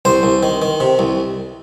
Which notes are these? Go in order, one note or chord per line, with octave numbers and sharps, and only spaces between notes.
C2 C5
C2
D#3
D#3
C3
C2